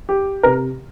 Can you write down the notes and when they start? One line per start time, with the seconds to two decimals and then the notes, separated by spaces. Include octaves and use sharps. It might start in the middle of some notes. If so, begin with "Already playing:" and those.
0.09 G4
0.43 C3 A#4